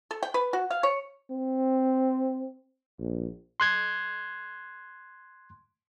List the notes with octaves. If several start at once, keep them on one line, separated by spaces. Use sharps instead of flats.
A4
G5
B4
F#4
F5
C#5
C4
A#1
C6 F#6 G#6